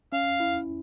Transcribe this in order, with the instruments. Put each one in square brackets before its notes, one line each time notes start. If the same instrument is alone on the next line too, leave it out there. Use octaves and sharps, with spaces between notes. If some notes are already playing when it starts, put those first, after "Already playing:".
[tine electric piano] C#4 [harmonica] F5
[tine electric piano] E4